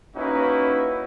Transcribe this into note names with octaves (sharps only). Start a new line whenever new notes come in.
A#3 C#4 D#4 E4 F#4 B4